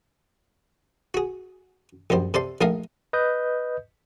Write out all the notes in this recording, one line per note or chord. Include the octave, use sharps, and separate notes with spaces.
F#4 G#4
A#1 F#2 G3 C5
C3 A4 C5 D5 C6
A#1 A3 D#4 A#4 F5 D#6
B4 D#5 D#6 G6